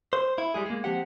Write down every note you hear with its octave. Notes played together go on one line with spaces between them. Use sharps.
C5
E4
G3 G#3 G#4
G#3 A#3
F3 C4 G4 F#5